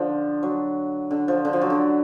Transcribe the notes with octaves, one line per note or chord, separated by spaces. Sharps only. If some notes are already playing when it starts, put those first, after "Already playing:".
Already playing: D3 F3
F#3
D3
F3
D3
F3
F#3
D3